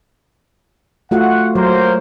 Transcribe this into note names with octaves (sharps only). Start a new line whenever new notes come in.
A3 F4 F#4 F#5
F#3 A#3 A#4 C5